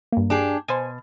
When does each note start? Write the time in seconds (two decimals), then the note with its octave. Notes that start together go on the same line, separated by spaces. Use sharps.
0.12 G2 A#3
0.30 D4 G4 G#4
0.68 B2 C5 G#5